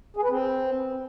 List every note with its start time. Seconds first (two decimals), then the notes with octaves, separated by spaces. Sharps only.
0.17 G#4
0.23 B4
0.30 C4